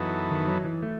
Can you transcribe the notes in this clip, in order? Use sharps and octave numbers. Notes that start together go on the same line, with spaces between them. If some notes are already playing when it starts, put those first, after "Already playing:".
Already playing: F#2 E3 B3 D#4 A4
D#3
F#3
E3
A3